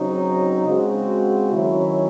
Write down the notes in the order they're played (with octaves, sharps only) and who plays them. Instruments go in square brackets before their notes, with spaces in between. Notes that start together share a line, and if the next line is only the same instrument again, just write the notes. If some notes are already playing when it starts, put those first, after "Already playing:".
Already playing: [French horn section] C#3 F#3 C4 D#4
C#3 G#3 C4 F#4
D#3 F#3 C#4 E4